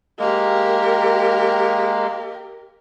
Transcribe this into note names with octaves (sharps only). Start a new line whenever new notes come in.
G#3 A#3 G4 A#4